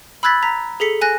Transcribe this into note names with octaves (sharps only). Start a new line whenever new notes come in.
B5 E6 F#6 G#6 A6 B6
A#5 B6
G#4 A4 B6 C#7
G#5 F#6 A#6